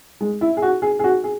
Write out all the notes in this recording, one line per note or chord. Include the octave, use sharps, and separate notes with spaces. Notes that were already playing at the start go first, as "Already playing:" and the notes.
G#3
E4
G#4
F#4
G#4
G#4
F#4
G#4